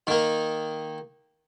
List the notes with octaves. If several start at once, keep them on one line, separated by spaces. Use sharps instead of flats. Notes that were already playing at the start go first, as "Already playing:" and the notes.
D#3 A#3